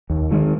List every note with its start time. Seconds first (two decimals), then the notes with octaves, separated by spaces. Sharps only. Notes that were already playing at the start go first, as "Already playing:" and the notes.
0.10 D#2
0.31 D#3 G#3